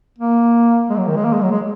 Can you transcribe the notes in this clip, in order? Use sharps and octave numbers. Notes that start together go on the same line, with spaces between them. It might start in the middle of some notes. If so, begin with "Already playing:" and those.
A#3
G#3
F#3
D#3
G#3
A#3
G#3
F#3
G#3